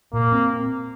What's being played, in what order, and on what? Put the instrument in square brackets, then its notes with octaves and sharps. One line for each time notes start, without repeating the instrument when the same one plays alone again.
[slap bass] A#2 [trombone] A#3
[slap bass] C4